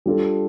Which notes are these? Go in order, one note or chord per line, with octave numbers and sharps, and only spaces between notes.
G3 D4 F4 A4